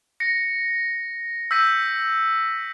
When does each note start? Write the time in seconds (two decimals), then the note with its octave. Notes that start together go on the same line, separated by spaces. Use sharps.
0.20 A#6 C#7
1.51 E6 G6 B6 D#7